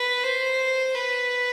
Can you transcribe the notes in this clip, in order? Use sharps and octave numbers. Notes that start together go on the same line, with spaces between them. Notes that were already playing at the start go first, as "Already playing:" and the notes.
Already playing: B4
C5
B4